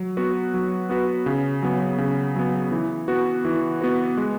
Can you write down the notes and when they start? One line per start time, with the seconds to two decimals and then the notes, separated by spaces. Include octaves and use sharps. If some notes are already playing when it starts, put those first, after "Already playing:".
Already playing: F#3
0.17 B3 F#4 B4
0.54 F#3
0.89 B3 F#4 B4
1.26 C#3
1.63 F#3 B3
1.98 C#3
2.36 F#3 B3
2.72 E3
3.08 B3 F#4 B4
3.45 E3
3.81 B3 F#4 B4
4.17 G#3